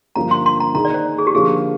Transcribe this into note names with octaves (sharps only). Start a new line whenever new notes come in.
G2 D3 F3 A#3 A#5
C6
C6
A#5
D#3 A#3 D#4 G#4 A#5
D5
C5
G#4
G4
D3 F3 A#3 F4 G#4